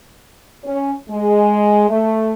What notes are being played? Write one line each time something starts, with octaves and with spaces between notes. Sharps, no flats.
C#4
G#3
A3